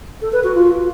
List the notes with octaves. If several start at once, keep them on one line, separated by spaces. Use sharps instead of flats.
A4
B4
F#4
F4